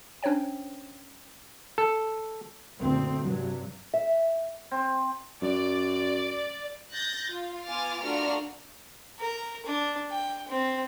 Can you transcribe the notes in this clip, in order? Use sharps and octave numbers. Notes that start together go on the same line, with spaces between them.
C#4 D4 C5 C#5 G5
A4
F#1 D2 A#2 C4
G2 C3 F#3
E5
C4
F#2 D5
F#6 G6 A6 A#6
F4
B3 F4 G#5 D6 F6 A6
A3 D4 F4 F#4 A#4 F6
A#4
D4
G5
C4